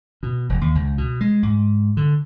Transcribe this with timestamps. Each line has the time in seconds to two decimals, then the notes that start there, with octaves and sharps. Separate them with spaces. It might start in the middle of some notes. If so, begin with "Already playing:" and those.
0.23 B2
0.49 E1
0.61 D#2
0.75 C#2
0.98 B2
1.21 G#3
1.43 G#2
1.97 D3